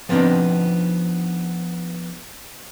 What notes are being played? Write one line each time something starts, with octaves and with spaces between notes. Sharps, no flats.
F3 B3 C4 D4 D#4